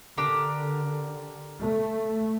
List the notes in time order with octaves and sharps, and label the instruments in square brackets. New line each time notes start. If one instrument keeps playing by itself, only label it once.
[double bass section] D3 [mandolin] D4 G4 A#4
[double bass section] A3